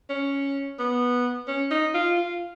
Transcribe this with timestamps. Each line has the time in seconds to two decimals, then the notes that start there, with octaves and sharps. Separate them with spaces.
0.10 C#4
0.79 B3
1.47 C#4
1.71 D#4
1.94 F4
2.17 F4